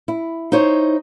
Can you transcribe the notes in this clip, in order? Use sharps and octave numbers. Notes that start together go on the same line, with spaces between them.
E4
D#4 E4 C5 C#5